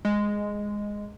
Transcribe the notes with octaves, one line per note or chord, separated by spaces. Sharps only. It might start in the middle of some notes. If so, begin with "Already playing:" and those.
G#3